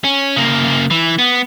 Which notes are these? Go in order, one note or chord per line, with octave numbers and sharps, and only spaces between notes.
C#4
C#3 A#3
E3
B3